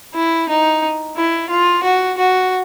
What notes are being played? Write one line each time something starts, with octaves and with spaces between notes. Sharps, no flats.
E4
D#4
E4
F4
F#4
F#4